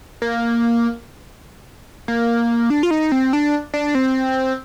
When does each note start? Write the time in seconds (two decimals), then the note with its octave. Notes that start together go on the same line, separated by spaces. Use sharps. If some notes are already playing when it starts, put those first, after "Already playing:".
0.22 A#3
2.08 A#3
2.70 D4
2.83 F4
2.91 D#4
3.12 C4
3.33 D4
3.74 D4
3.95 C4